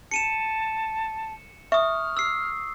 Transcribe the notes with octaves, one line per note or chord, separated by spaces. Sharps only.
A5 C#7 D#7 E7
E5 C#6 D#6 F6
E6 C7